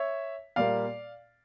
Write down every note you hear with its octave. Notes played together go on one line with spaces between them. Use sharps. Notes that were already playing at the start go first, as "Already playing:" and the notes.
Already playing: C#5 E5
A#2 G3 A#3 D5 F5